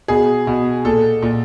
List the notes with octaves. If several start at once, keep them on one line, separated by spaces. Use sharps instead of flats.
B2 G#4
B2
A#2 A4
A#2